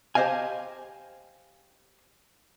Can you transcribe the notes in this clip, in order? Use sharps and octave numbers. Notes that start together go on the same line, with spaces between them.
G4 C5 D#5 F5 G#5